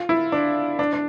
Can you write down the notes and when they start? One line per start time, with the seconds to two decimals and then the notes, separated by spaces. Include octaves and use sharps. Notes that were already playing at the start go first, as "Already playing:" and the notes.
Already playing: F4
0.09 E4
0.32 D4
0.79 D4
0.93 D4